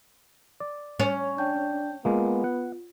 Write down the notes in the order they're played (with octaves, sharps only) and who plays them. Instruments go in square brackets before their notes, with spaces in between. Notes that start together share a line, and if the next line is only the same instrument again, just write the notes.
[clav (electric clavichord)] D5
[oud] C#4
[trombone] D4 [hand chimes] G5 A5 G6
[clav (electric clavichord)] G#3 A#3 [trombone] B3 [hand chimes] F4
[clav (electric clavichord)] F#5